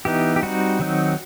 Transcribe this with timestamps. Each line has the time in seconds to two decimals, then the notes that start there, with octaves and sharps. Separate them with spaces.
0.05 E3 B3 D#4 G4
0.36 G4
0.43 G3 C4 D#4 F#4
0.79 D#3 F#3 C4 D#4